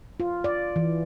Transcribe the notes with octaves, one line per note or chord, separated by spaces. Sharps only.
F4
D5
E3